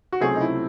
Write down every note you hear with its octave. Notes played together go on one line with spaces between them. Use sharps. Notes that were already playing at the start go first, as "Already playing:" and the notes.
F#4
C#2 C3 F#3 A3 C4 G#4
D#4
E4